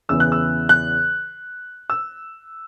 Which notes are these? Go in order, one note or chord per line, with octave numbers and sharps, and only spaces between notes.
E2 C#3 E3 B3 E6
F#6
E6
F#6
E6